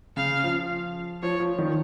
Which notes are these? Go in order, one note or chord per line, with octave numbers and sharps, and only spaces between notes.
C#3 F5
F3
F3 C#5
F3
D#3